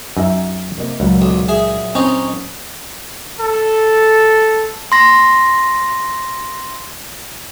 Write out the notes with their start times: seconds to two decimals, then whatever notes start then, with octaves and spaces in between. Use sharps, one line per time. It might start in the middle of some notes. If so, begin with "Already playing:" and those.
0.17 F#2 D#4 E5
0.78 C3 A#3 D#5
1.00 C#2 A#2 F#3
1.22 B1
1.49 G#4 E5
1.95 C4 C#4 D#4 C5
3.38 A4
4.92 C6 A#6